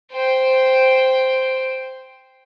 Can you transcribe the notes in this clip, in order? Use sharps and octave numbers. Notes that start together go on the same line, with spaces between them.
C5 G5